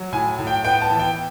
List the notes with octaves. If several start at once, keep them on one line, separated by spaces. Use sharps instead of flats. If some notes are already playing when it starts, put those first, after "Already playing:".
Already playing: F#3
A2 G#5
A2
G5
B3 G5
A5
E3
G5